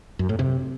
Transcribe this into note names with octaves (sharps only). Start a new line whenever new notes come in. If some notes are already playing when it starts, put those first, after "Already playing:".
F#2
A2
C3